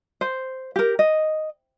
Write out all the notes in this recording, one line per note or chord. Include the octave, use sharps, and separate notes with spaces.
C5
G4 A#4
D#5